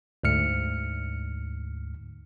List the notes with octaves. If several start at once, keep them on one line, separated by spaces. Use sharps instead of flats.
D2 G#2 F6 C#7